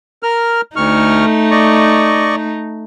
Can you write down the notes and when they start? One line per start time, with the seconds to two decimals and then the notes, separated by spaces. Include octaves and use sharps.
0.23 A#4 F6
0.76 D2 A3 D#4 C#6 F6
1.51 D5 D#5 C#6